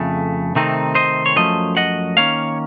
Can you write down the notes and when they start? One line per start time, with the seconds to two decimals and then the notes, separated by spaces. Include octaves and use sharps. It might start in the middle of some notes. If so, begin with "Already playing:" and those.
Already playing: F2 C#3 A3
0.55 C3 D#3 A3 C4 D#4
0.95 C5 D#5
1.26 C#5
1.35 F#2 F3 A3 C#4 C5 D#5
1.77 D#5 F#5
2.17 D#3 A#3 C#4 C#5 F5